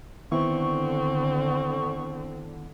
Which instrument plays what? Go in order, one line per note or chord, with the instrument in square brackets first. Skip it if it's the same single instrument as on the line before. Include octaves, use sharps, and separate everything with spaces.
[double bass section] D3 [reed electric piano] D#3 B3 E4 [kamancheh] C4 [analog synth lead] C#6